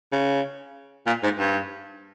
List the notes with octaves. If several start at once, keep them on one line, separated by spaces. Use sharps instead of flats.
C#3
A#2
G#2
G2